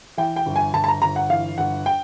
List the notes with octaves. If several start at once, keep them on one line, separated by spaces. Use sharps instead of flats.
E3 G5
G5
G1
G#5
G1 A5
A5
A#5
G1 A#5
F#5
E3 F5
G1 F#5
G5